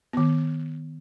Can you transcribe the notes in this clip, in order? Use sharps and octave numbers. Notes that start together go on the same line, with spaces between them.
D#3 B3